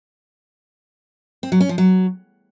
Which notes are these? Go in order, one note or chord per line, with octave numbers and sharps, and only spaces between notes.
C4
F#3
C#4
F3
F#3